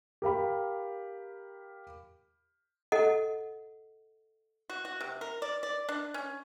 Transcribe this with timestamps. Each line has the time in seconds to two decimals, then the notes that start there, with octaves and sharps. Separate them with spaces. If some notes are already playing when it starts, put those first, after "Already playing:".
0.22 G4 A#4 F5 B5
2.92 A4 D#5 F#5
4.70 F#4
4.85 F#4
5.01 C3
5.21 A#4
5.42 D5
5.63 D5
5.89 D4
6.14 C#4